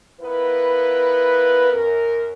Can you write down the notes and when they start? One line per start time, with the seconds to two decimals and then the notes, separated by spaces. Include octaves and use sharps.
0.21 B3 E4 F4 A#4 B4
1.72 F#2 A#4